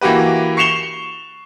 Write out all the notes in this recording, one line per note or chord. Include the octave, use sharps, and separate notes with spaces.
E3 A#3 F#4 G4 B4
C#6 C7 C#7 E7 F7 G7